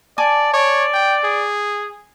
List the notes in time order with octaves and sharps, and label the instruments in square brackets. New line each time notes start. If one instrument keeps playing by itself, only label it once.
[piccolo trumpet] D5 [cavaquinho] G#5 A5 D6
[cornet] C#5 [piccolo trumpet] D5
[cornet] G5
G#4